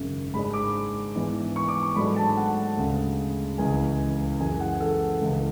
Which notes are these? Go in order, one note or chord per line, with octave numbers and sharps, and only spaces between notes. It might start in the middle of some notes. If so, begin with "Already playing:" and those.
Already playing: G#1 F#2 C#3
G#2 G#3 D4 B5
D6
G#2 E3 B3 D4
C#6
D6
C#6
G#2 F#3 A3 D4 B5
A5
F#5
D2 C#3 G#3
C#2 C#3 E3 G#5
F#2 E3 G#3 G#5
F#5
A4
C#2 C#3 E3